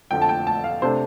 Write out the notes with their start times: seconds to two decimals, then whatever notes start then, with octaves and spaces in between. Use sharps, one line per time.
0.11 F2 D3 F3 G5
0.22 A5
0.29 G5
0.47 A5
0.64 F5
0.82 C3 A3 D4 C5